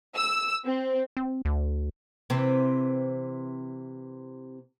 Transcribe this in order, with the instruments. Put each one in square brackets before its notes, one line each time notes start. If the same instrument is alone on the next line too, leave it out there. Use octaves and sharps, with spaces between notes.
[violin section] E6
C4
[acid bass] C4
D2
[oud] C3 E3 C4